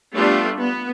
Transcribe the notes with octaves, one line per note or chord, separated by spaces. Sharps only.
G3 A3 B3 D4 F4
B3